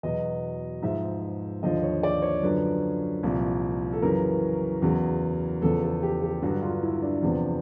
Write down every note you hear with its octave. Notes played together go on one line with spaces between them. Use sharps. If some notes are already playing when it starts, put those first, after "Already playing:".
E2 B2 F#3 D#5
G#2 F3 E5
D#2 D3 F3 D#5
C#5
D5
C#5
F#2 D3 F3 B4
C2 A#2 F3
A4
F#2 C#3 E3 A#4
E2 C#3 F#3
E2 C#3 F3 A4
A4
G4
G4
G2 D3 F#3 F#4
F4
E4
D4
E2 C3 F3